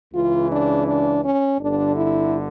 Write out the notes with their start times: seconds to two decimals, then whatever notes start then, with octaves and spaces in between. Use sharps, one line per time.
0.13 C#2 C#3 E3 F4
0.50 D4
0.86 D4
1.23 C#4
1.59 G1 G2 D3 D4
1.95 E4